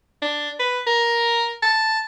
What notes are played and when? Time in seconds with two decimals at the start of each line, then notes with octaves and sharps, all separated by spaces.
0.22 D4
0.60 B4
0.87 A#4
1.63 A5